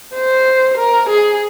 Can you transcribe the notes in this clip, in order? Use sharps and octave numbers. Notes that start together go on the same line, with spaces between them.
C5
A#4
G#4